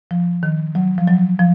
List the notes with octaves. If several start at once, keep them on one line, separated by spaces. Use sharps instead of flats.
F3
D#3
F#3
F3
F#3
F3